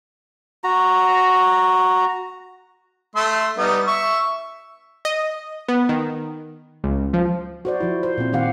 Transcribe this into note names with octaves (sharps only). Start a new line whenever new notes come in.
F#4 A#5
A3 E5 C6
G3 B3 D#4
E5 C#6
D#5
B3
D#3
C#2
F3
F#4 C5 D5
F3 E4
C5
A#2 C4
A#2 D#3 C4 G4 F5 F#5